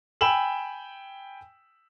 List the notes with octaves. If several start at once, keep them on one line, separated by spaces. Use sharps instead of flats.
G5 G#5 B5 E6 E7 F#7